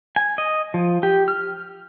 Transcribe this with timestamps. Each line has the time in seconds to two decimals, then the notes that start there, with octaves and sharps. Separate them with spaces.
0.16 G#5
0.38 D#5
0.74 F3
1.03 G4
1.28 F6